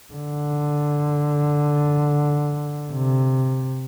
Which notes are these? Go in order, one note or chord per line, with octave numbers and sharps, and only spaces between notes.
D3
C3